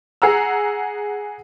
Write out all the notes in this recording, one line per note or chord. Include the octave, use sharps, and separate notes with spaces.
G#4 F#5 A#5 E6